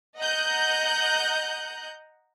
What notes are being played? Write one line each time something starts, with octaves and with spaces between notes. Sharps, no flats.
D#5 F#5 A#5 F#6 G6